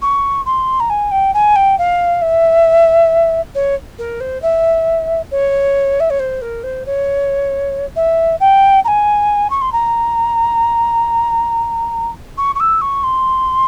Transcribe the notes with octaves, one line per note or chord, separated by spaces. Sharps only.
C#6
C6
A#5
G#5
G5
G#5
G5
F5
E5
C#5
A#4
C5
E5
C#5
E5
C#5
C5
A#4
C5
C#5
E5
G5
A#5
G#5
C#6
C6
A#5
C#6
C#6
E6
C#6
C6